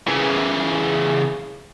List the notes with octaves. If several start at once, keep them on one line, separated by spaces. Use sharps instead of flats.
C#3 E3